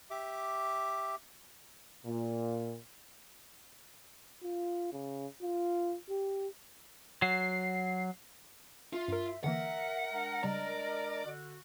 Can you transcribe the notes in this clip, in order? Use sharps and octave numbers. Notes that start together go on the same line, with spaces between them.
G4 E5 D6
A#2
F4
C#3
F4
G4
F#3 C7
F4 E5
G2 A#4
D3 E3 A#3 A#4 E5 F#5
G#3 D4 A#4
C#3 G3 D5 D#5 A#5
D3 F#4